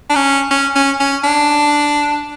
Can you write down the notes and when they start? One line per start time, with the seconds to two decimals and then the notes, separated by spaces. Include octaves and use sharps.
0.09 D4
0.15 C#4
0.51 C#4
0.75 C#4
1.00 C#4
1.24 D4